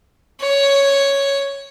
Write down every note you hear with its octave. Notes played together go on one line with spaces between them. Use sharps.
C#5